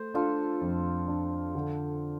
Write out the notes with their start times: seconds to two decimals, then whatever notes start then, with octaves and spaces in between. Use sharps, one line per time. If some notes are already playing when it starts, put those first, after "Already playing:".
Already playing: A3 C5
0.14 D4 F4 A4
0.61 F2
1.08 D4
1.55 D3